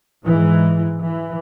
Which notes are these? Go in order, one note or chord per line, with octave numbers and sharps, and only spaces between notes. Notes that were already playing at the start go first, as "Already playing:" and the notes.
G#2 E3 G#3
E3